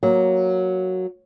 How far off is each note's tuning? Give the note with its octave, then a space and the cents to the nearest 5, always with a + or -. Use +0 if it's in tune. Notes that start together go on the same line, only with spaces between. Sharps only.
F#3 +0 A#3 +5